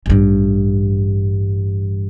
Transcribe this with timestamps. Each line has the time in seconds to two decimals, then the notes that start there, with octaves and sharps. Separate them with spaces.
0.06 A1 G2